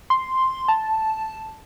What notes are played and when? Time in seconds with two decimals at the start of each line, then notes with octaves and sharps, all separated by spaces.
0.10 C6
0.68 A5